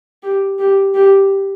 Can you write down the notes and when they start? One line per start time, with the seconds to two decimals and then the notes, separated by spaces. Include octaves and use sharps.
0.23 G4
0.59 G4
0.94 G4